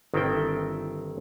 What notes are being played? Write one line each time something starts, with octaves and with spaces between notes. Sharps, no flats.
G1 D#3 C4 E4 A4 G5